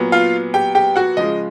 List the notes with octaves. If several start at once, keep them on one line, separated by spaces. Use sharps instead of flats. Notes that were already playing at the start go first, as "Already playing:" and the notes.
Already playing: A#2 F#3 B3
F4 F5
G4 G5
G4 G5
F#4 F#5
C#3 F3 G#3 D#5